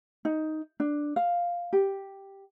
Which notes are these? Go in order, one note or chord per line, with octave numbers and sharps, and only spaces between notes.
D#4
D4
F5
G4